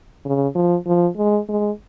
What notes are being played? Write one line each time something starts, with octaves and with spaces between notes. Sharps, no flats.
C#3
F3
F3
G#3
G#3